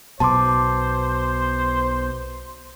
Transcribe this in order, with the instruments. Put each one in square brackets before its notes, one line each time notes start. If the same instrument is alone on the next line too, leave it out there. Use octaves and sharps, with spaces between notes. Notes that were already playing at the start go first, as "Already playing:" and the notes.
[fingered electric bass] B1 B2 [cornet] C5 [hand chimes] A5 C6 D6